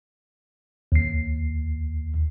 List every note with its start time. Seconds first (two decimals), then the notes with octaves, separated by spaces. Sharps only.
0.92 D#2 C7